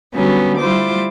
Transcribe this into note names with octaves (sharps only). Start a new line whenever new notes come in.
D3 F#3 G3 B3 C#4
G3 E4 F4 C5 D6